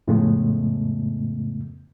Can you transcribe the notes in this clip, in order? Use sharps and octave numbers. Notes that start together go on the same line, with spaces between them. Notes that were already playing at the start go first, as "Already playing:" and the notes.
F2 A2 C#3 G#3 A3 B3